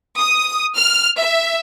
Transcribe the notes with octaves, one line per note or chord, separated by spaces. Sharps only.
D#6
F6
E5